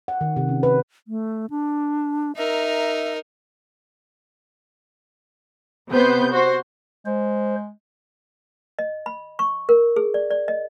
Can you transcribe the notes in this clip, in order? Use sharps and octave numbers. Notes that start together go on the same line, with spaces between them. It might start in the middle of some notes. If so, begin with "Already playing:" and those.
F#5
D#3
C3
C#4
B4
A3
D4
D#4 A#4 E5
C3 B3 B4 C5 G6
F#4 C5
G#3 C5
D#5
B5
C#6
A#4
G#4
D5
D5
D#5